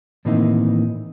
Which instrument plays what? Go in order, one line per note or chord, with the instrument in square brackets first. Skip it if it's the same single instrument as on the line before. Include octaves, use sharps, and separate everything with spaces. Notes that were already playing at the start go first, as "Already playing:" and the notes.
[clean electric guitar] A2 D#3 E3 A#3 C4 D#4